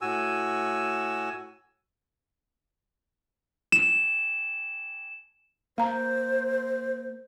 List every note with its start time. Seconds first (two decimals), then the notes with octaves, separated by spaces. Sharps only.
0.01 A2 F#4 G#5 E6
3.72 E7
5.78 A#3 C5 F5 A#5